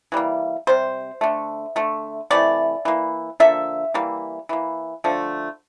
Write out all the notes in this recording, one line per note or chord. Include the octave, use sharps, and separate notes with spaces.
E3 G3 A#3
C3 G3 C5
D3 A3
D3 A3
C3 E3 A3 D5
E3 A#3
D3 F3 A#3 E5
E3 G3 A#3
E3 A#3
D3 F3 A3